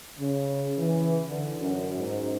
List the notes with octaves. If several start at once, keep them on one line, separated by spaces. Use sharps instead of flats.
C#3
E3
D3
F#2
G#2